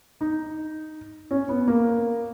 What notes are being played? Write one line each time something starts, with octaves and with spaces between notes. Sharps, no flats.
D#4
C#4
B3
A#3